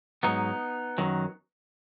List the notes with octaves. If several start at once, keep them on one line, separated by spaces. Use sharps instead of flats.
G#2 F#3 B3 D#4
F#2 D#3 F#3